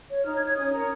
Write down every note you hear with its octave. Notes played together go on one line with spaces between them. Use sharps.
C#5
D#4 F6
G#6
C#5
G#6
C#4 D#6
A#4 C#5 A#5